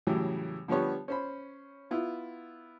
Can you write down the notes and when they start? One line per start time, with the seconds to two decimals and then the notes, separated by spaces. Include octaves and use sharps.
0.07 A2 C#3 E3 F#3 G3
0.68 D3 F3 G3 B3 C#5
1.08 C#4 C5 B5
1.91 B3 E4 F4